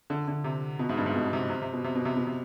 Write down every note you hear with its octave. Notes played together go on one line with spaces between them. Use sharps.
D3
D3
C3
B2
G#2
G2
G#2
B2
B2
C3
C3
C3
B2
C3
B2
C3
B2
C3